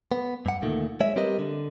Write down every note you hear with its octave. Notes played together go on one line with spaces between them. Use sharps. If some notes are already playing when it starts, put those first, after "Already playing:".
B3
G2 F#5
D2 A#2 D#3 A3
G#3 C#5 E5
G3 C4 G4 A#4 B4 D#5
D3